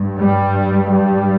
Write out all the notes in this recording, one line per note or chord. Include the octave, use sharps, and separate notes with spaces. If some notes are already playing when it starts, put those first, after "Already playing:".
Already playing: G2
G3
G3